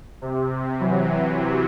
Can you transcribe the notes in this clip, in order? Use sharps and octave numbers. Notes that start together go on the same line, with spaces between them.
C3
E3 F#3